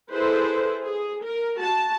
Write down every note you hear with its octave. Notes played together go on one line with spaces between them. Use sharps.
E4 G#4 A4 B4 C5
G#4
A#4
F#4 A5